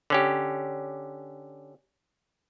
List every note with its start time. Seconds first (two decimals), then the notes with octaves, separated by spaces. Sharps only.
0.10 D3 C#4 G4